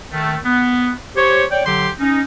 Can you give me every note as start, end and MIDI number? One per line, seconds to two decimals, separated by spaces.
0.12 0.37 51
0.12 0.37 57
0.44 0.91 59
1.17 1.44 67
1.17 1.44 72
1.17 1.44 73
1.51 1.64 73
1.51 1.64 74
1.51 1.64 79
1.66 1.90 50
1.66 1.90 54
1.66 1.90 67
1.66 1.90 84
2.00 2.22 61
2.00 2.22 63